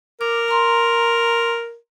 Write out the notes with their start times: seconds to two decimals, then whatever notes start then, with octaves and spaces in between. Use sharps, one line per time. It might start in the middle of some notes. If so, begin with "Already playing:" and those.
0.21 A#4 D6
0.48 A#5 C6